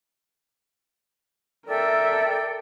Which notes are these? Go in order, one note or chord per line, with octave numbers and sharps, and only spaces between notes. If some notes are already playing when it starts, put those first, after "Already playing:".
A4 A#4 D5 E5 G5